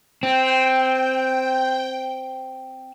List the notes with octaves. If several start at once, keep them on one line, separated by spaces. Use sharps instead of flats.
C4 G5